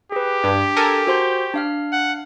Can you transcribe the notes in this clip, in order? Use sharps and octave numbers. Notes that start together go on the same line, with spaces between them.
G4 G#4 B4
G2 D4
A4 A#4 G#5
F#4 C5 C6
D4 F5 F6
F#5